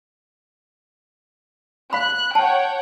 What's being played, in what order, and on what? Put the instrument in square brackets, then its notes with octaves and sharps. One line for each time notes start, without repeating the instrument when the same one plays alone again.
[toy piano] F5 B5 [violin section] F#6
[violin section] C#5 F#5 G5 [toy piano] A5